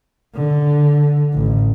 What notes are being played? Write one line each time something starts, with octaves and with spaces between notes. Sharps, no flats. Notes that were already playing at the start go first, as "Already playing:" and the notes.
D3
A1